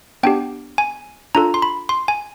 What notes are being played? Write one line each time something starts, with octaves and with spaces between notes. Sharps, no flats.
B3 D4 G4 G5
G#5
D4 F4 A4 A#5
C6
B5
C6
G#5